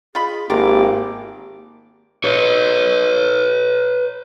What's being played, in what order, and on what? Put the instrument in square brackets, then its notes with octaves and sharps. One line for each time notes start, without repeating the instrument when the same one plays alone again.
[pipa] F4 D#5 B5 [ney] G#4
[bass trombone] G#1 [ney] A#3 [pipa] F4 A#4 [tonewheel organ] G4 D6
[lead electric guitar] B4 C#5